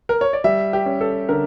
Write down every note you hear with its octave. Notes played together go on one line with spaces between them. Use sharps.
A#4
C#5
D5
G3 E5
G4
C#4
A4
D3 A#4